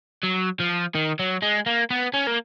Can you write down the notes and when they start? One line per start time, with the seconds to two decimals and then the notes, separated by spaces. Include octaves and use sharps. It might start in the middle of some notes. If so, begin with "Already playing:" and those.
0.24 F#3
0.60 F3
0.95 D#3
1.19 F#3
1.42 G#3
1.66 A#3
1.91 B3
2.14 C#4
2.27 A#3